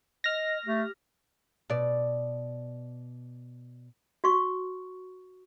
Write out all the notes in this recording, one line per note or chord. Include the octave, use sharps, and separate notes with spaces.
D#5 F6 A#6
A3 G4
B2 D5
F#4 C#6